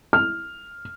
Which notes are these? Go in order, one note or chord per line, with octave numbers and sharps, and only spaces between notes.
F6